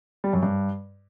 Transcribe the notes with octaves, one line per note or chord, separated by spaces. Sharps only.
G3
F#2
G2